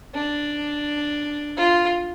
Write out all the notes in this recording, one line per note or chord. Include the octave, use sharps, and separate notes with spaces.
D4
F4